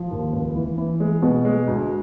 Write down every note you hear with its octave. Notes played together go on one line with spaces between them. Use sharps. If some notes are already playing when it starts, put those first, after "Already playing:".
Already playing: F3
D#2
C#2
E3
E3
G#3
B2
G#3
D2